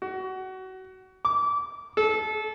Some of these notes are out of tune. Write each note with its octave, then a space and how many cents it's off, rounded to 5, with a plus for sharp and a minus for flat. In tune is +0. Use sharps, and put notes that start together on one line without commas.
F#4 +25
D6 -25
A4 -25